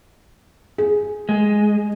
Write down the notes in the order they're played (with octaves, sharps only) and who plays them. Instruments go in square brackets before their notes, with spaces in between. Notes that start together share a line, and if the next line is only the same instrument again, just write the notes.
[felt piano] G#4
[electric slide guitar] G#3